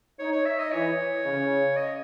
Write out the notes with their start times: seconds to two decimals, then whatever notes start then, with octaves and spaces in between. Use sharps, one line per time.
0.19 D#4 C#5
0.32 C#5
0.45 E5
0.59 D#5
0.71 E3 C#5
1.24 C#3
1.76 D#5